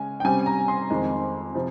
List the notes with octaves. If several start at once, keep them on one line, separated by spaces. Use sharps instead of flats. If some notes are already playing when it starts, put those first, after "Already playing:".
Already playing: C#3 G#3 C#4 G#5
G5
C3 G3 C#4 G#5
A#5
C6
F2 D#3 G#3 C4
C3 F3